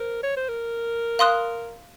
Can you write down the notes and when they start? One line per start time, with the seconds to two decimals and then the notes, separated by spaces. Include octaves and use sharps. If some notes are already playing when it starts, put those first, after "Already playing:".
Already playing: A#4 C5
0.23 C#5
0.37 C5
0.49 A#4
1.19 F5 C6 D#6 F#6